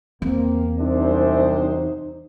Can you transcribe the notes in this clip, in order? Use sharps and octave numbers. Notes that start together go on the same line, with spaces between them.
E2 A#3 C4
C2 F#2 C3 D4 D#4 C5